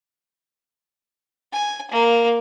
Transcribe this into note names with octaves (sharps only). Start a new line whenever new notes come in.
G#5
A#3